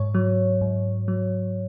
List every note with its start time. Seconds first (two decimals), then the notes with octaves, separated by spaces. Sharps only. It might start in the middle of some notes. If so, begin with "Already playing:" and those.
Already playing: G#2 C#5
0.15 F#3
0.61 G#2
1.08 F#3